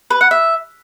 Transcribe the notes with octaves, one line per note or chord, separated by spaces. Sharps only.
B4
F#5
E5